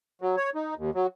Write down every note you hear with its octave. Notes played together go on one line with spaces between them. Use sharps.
F#3
C#5
D#4
D#2
F#3